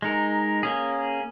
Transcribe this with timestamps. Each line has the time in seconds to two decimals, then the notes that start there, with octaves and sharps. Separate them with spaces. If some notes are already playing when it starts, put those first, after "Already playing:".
0.02 G#3 D#4 A#4
0.63 A#3 C#4 G#4